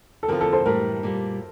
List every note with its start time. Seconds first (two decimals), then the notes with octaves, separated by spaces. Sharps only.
0.23 A4
0.28 E2 D3 F3 C4 F4 A#4
0.41 A4
0.53 A4 C5
0.66 A2 E3 G3 A#4
1.03 A#2 G3 A#3